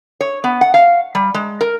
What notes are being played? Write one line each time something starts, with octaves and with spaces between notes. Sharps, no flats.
C#5
B3
F#5
F5
G3
G#3
A#4